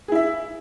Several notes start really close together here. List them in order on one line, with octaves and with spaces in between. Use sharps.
G#4 E4 E5